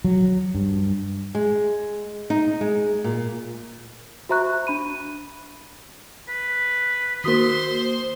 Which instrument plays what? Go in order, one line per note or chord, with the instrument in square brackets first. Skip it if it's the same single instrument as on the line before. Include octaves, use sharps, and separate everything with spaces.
[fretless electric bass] F#3
G2
[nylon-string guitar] G#3
D#4
G#3
A#2
[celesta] F#4 C5 E5 A#5 C#6 F#6
D4 B5 D#7
[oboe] B4
[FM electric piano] D#3 A#3 [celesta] F#4 D#6 B6 [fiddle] C5 C6